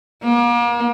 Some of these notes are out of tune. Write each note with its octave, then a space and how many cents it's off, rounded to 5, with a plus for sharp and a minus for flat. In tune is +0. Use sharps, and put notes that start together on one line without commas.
A#3 +40